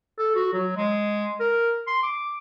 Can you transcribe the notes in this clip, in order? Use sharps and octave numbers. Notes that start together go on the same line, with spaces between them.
A4
F#4
F#3
G#3
A#4
C6
D6